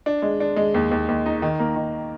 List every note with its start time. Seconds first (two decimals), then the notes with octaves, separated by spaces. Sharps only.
0.06 D4
0.22 G#3
0.40 D4
0.56 G#3
0.74 D#2
0.91 D#2
1.08 D#2
1.26 D#4
1.42 D#3
1.59 A#3
1.76 D#3